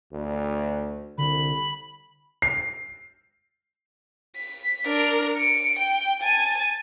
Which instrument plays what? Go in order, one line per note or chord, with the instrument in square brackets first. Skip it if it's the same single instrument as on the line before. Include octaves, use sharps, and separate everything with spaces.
[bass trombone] D2
[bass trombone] C2 [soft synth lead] D3 [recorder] B5
[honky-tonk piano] C7
[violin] B6
D4 A#4
C#7 D7
G5
G#5 A5